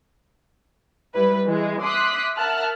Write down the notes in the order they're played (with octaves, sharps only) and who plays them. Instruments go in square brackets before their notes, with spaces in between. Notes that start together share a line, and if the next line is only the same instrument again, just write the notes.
[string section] G3 E4 B4
E3 G#3
E5 C6 D6 D#6 F#6 B6
A#4 E5 F#5 A5 F6 F#6